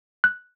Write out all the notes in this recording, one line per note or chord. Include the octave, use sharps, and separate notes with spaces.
F#6